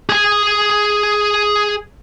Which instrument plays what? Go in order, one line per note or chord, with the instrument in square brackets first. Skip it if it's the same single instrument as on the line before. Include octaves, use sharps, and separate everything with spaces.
[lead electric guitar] G#4 G#5